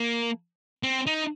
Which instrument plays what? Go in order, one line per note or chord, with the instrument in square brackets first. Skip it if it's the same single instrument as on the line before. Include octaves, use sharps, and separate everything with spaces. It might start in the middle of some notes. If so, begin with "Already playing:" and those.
Already playing: [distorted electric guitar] A#3
C4
D#4